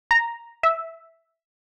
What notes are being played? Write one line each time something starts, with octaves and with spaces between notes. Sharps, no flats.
A#5
E5